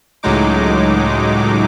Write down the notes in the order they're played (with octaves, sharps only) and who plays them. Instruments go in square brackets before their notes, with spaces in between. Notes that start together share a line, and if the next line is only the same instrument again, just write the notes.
[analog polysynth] C#2 A2 F#3 G#3 D#4 D6